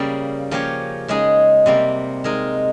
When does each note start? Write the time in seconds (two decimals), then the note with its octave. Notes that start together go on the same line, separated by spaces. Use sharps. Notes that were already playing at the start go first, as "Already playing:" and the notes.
Already playing: C#3 G3 A#3
0.51 F3 A#3 C#4 G4 C#5
1.08 C#3 G#3 D#4 G#4
1.66 C3 G3 A#3
2.24 G#3 D#4 A#4